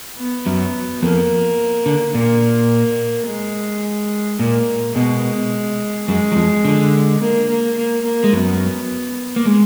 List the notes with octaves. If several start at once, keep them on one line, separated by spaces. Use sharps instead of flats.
B3
F#2 F#3
F2 F3 A#3
D3
A#2 A#3
G#3
A#2 A#3
B2 G#3
F#2 F#3 G#3
F#3
F2 F3
D3
A#3
A#3
A#3
A#3
G#3
F#2 F#3 B3
A#3
G#3